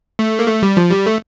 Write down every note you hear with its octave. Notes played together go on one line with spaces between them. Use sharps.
A3
A#3
A3
G3
F3
G3
A3